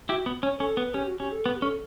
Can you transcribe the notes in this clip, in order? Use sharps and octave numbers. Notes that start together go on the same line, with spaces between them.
E4 F#4 G4
B3
C#4 C#5
C#4 A4
B3 B4
C#4 G4
F#4
C#4 G4
A4
B3 B4
G4
C#4 A4